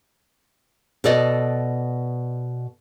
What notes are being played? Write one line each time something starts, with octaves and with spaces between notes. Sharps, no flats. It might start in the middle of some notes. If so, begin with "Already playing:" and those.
B2 A4 D5 D#5